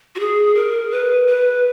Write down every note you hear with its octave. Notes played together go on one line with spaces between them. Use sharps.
F#4
G#4
A#4
B4
B4